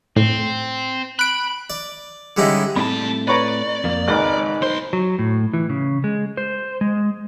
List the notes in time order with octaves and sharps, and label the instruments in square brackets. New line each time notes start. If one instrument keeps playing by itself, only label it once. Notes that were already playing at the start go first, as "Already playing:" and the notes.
[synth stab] A2 [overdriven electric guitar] C4
[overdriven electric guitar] B5 [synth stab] F#6 D7
[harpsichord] D5
D3 G3 G#3 C#4 D#4 E4
[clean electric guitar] A2 C4 B5 [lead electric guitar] G3 A5
[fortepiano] B4 C#5 A#5 [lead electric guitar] D5
[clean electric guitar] F2 A#3
[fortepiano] G#1 C#2 [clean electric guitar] D#4 B4
[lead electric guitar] B1 C6 [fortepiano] C5
[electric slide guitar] F#3
A2
E3
C#3
G#3
C5
G#3